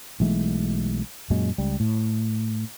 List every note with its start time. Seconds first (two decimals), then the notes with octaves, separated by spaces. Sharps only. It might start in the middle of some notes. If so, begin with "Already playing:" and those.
0.20 B1 E3 G#3 A3
1.30 F#2 A#2 F#3 G#3
1.58 C#2 G3
1.80 A2